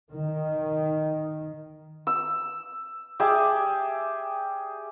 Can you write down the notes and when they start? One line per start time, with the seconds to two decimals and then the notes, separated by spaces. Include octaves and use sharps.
0.12 D#3
2.07 E6
3.19 G4 G#4 D5 E5